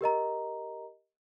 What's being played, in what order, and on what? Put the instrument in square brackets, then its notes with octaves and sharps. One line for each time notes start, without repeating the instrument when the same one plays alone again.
[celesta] G4 A#4 D#5 A#5